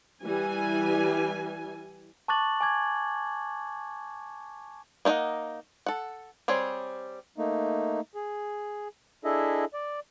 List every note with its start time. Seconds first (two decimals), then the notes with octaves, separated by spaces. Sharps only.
0.23 E3 G3 G#5
2.28 A5 C#6 D6 F#6 A6 F#7
2.61 G#5 D6 G#6
5.05 A#3 D#4 A4 D#5 F#5
5.86 A4 F#5
6.48 G3 C4 G#4 C#5
7.38 A3 A#3 D#4
8.15 G#4
9.24 D4 E4 G#4 A4 D#5 E5
9.74 D5